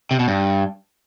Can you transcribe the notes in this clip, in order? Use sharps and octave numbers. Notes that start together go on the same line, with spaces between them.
C3
B2
G2